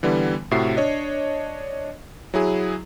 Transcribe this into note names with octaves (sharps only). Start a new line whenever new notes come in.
D3 E3 G3 B3
A2 C3 F#4 E5 C7
D4 C#5 D#5
F#3 E4 G#4